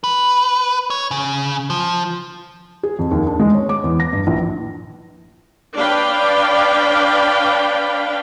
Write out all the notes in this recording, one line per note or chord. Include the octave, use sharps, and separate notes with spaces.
B4
C#5
C#3
F3
G#4
F2
D#2
D4
G#3
C#5
D6
E2
A#6
G2
A#1
D4 B4 C#5 D5 F5 G5